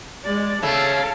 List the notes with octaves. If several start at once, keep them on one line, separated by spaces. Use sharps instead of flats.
G#3 D5
C#3 A3 A4 F5